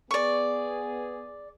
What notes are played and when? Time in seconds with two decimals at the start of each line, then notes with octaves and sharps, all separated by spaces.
0.11 B3 G#4 D5 C#6